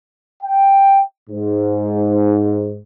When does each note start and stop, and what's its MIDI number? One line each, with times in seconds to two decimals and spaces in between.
0.43 1.02 79
1.30 2.78 44